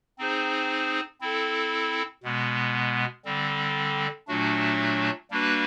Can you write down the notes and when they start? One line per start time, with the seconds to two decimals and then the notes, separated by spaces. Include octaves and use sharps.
0.18 C4 D#4 G#4 C5
1.21 C4 E4 A4
2.24 B2 G#3 B3
3.25 D3 G3 C4
4.28 A#2 F#3 A3 D4 F#4
5.31 G3 A#3 D4 F#4 B4